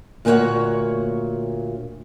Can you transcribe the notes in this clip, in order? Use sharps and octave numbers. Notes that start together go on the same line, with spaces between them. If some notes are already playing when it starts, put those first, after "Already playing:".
D2 A#2 A#3 C4 C#5 F#5